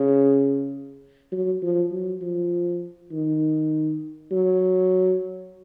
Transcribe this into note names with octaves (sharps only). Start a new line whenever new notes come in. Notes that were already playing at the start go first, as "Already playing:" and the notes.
Already playing: C#3
F#3
F3
F#3
F3
D#3
F#3